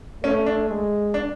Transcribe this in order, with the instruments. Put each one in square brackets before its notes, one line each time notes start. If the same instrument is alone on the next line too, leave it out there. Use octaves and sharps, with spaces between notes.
[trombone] A3 [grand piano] C#4
[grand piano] D4
[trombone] G#3
[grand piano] D4